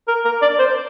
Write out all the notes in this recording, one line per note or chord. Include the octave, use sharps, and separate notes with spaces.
A#4
A#4
D5
C5